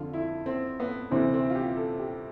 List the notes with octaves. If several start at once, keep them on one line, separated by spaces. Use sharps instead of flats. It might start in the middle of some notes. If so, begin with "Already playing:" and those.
Already playing: F2 D3 F4
E4
C4
B3
D2 C3 E3 C4
C4
F4
G4
A4
G4